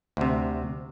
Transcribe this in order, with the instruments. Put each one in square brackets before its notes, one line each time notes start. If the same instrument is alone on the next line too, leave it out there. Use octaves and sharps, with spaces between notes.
[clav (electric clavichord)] D2 C3